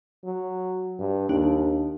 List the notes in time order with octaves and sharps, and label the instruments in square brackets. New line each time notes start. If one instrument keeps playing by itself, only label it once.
[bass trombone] F#3
G2
[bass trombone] D#2 [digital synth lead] D4